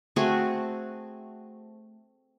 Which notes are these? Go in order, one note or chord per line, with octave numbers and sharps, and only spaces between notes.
A3 C4 F#4 G#4